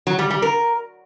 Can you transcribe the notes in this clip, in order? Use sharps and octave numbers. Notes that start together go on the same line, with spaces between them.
F#3
G3
G3
A#4